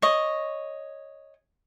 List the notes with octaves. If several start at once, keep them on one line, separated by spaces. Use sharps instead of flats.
C#5 D#5